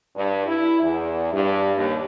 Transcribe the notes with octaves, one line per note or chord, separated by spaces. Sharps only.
G2
E4
E2
G2
D#2